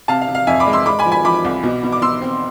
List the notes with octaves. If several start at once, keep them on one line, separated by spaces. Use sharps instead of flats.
C3 F5 A5
F5
C3
F5
F2 E5 G#5
B5 D6
G#3
C6 E6
G#3 B5 D6
G#5 B5
F3
G#5 B5
F3 B5 D6
C2
B2
B2
D6
B2 C6 E6
C4